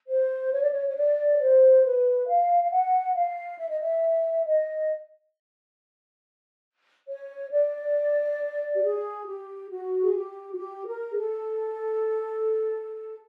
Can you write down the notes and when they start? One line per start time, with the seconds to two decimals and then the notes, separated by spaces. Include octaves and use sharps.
0.08 C5
0.52 C#5
0.62 D5
0.72 C#5
0.89 C#5
0.96 D5
1.31 C#5
1.40 C5
1.84 B4
2.28 F5
2.63 F5
2.71 F#5
3.15 F5
3.58 E5
3.69 D#5
3.80 E5
4.46 D#5
7.08 C#5
7.51 D5
8.75 G4
8.83 G#4
9.26 G4
9.70 F#4
10.02 G#4
10.14 G4
10.53 F#4
10.57 G4
10.87 A#4
11.10 G#4
11.16 A4